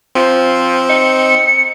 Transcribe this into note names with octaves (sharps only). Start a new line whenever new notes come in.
F3 C4
D#4 C#7